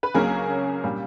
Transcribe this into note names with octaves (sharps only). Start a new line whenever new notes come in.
B4
C#2 C#3 F#3 A#3 C#4 G#4 A#4
A#2 G3